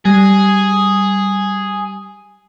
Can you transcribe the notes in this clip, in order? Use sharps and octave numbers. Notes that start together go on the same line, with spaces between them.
G3 G#4